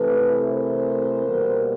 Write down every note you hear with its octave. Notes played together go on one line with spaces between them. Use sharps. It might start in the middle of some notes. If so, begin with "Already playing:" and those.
Already playing: C3 E3 A3 A4 B4
A#4 C5
B2 G3 A#3